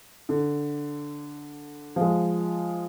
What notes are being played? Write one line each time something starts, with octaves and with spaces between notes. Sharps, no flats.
D3
F3 G#3